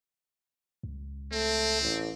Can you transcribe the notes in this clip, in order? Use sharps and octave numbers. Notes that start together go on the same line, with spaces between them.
C#2
A3 C4
A1